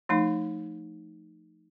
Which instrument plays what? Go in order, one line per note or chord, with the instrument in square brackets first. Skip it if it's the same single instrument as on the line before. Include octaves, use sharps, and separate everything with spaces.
[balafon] F3 A3 D#4